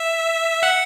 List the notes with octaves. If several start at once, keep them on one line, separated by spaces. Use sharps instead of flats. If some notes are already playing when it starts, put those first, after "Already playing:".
Already playing: E5
F#5